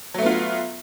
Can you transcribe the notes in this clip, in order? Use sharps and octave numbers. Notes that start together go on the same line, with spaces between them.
F#3 A3 B3 F4